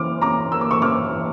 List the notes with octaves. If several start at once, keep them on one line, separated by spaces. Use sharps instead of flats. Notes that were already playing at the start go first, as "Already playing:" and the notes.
Already playing: C#3 E3 A#3 D6 F6
C#4 A#5 D6
A#3 E6
D6
C#6 E6
C#3 D6 F6
E3